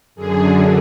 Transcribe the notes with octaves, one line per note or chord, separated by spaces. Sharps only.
F#2 D3 G#4